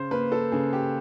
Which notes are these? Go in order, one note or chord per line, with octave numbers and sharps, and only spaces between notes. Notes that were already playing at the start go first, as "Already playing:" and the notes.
Already playing: C#3 C5
A#3 B4
A4
C#3 G#4
G4